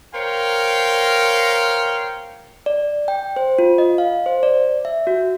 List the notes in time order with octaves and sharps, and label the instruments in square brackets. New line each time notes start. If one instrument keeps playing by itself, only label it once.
[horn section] A#4 C5 C#5 F5 G5
[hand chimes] D5
G5
C5
F4
D#5
F5
C5
D5
E5
F#4